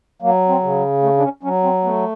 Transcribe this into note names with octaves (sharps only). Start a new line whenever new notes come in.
F#3 A#3
C4
C#3
A3
D4
C#4
F#3 C#4
C4
A3 B3